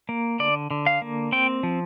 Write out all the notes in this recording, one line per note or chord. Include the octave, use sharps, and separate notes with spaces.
A#3
D3 D5
D3
F5
A#3
C4 G5
F3